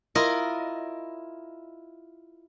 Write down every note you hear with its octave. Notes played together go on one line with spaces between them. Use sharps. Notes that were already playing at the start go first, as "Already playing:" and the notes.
E4 F4 A#4 D#5